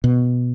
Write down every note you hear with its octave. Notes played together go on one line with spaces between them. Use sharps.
B2